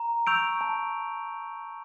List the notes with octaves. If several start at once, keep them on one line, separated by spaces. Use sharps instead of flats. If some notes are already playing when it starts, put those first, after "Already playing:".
Already playing: A#5
C#6 E6 G6 D7 F7
A5